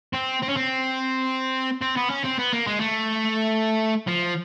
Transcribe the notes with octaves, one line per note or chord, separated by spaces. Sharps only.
C4
C4
C#4
C4
C4
B3
C#4
C4
B3
A#3
G#3
A3
F3